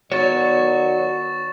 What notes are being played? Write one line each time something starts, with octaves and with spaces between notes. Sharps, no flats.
D#3 B3 F#4 C#5 D5 C#6 A6 E7